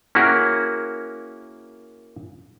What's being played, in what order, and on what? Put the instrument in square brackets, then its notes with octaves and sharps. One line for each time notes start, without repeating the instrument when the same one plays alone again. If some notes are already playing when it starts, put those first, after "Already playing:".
[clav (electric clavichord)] A#3 C#4 E4 F#4 G#4 A#4